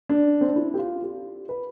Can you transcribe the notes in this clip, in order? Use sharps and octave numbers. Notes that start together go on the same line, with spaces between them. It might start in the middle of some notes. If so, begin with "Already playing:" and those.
D4
C4
D4
E4
G4
F4
G4
B4